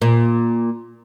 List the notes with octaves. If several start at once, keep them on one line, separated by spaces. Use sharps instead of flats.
A#2